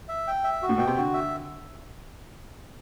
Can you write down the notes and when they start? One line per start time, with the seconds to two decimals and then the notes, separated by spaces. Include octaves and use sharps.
0.09 E5
0.27 G5
0.44 E5
0.62 F#4
0.69 A2
0.78 B2 G5
0.87 C3
0.97 D3 F#4
1.14 E5